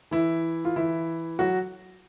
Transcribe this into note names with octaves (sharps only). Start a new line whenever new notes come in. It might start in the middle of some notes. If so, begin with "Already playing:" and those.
E3 E4
F4
E3 E4
F#3 F#4